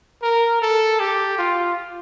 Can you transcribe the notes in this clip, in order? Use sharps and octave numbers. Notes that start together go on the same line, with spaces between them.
A#4
A4
G4
F4